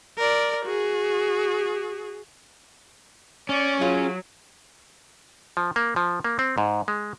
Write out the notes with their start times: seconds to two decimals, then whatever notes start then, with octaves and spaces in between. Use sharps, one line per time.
0.18 A#4 D5
0.65 F#4 G#4
3.49 C#4 D5 C#6
3.81 F#3 F4 G#4
5.57 F3
5.76 A#3
5.96 F3
6.24 A#3
6.39 C4
6.58 G#2
6.88 G#3